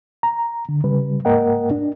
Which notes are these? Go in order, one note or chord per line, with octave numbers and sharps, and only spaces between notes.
A#5
D3
C#3 G3 B4
G#2 A#3 A#4 D#5 F#5 G5
D4